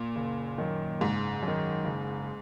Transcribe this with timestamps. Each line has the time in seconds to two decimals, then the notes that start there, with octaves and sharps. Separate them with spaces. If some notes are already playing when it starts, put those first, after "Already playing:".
Already playing: A#2
0.16 F#1
0.58 F#2 D#3
1.01 F#1 G#2
1.43 F#2
1.48 D#3
1.85 F#1